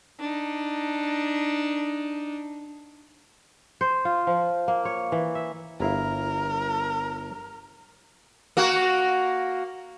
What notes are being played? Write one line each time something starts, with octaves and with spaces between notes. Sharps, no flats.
D4 D#4
C5
F4
F3
A#3
C#5
E3
E5
G1 E4 A#4 F5
A#3 F#4